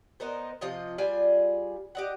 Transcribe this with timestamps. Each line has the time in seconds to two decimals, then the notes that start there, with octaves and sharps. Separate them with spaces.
0.20 B3 D#4 A#4 C5
0.61 C3 F3 F4 D#5
0.98 G3 F4 G#4 G#5
1.95 G4 D#5 F#5